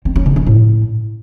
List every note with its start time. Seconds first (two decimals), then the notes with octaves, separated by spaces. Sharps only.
0.05 C4
0.16 C#4
0.26 C#3
0.36 C#4
0.46 A2